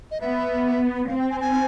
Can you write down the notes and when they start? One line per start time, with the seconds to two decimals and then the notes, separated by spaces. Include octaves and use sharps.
0.11 D#5
0.21 B3 E5
1.07 C4 F5
1.19 G5
1.30 G#5
1.41 G#5